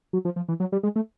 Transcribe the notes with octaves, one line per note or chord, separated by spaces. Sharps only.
F#3
F3
F3
E3
F#3
G3
G#3
A3